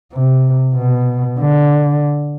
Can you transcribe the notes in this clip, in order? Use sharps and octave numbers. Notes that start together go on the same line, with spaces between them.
C3
B2
D3